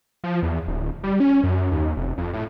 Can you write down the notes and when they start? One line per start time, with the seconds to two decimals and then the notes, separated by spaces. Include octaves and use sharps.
0.24 F3
0.43 E2
0.68 D1
1.03 G3
1.20 C#4
1.44 F#2
1.72 D#2
1.97 F1
2.18 F2
2.33 A2